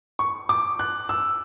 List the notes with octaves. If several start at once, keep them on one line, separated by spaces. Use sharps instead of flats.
C#6
D6
F#6
E6